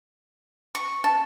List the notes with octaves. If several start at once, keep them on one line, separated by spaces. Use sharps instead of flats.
C#6
A5